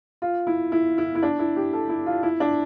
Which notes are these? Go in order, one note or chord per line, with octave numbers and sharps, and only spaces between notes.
F4
E4
E4
E4
E4
D4
E4
G4
A4
E4
F4
E4
D4